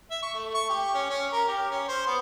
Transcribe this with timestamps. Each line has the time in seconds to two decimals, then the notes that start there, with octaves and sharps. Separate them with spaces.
0.11 E5
0.22 C#6
0.34 A3
0.54 C#6
0.69 G4
0.94 C#4
1.10 C#4
1.32 A#4
1.48 G4
1.71 C#4
1.88 C5
2.07 B3